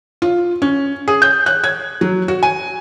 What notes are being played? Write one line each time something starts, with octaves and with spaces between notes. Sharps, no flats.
F4
C#4
G#4
G6
F#6
G#6
F#3
F#4
G#5